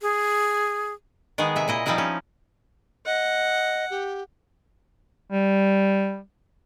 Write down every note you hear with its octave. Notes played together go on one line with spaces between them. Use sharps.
G#4
D#3 G#3 B3 G#4
C3 E5 G#5
A#2 E4 D#5
F3 G3 C4 D#4 E4
C#4
D#5 F#5
G4
G3